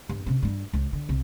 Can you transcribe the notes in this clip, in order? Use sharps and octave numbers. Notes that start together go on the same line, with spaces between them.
G2
C3 C#4
G2 G3
C#2 C#3
D3
C2